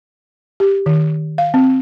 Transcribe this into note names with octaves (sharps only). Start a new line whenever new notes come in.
G4
D#3
F5
C4